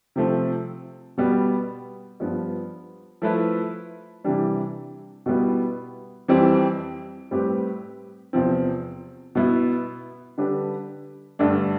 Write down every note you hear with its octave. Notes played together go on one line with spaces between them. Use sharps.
C3 F3 A3 C4
B2 G3 B3
G2 F3 B3
F3 A3 E4 B4
C3 E3 G3 D4
B2 G3 B3 E4
F2 E3 G3 C4
A2 G3 C4 G4 B4
E2 C3 F3 C4
B2 B3 E4
D3 G3 D4 G4 B4
G2 D3 A3 D4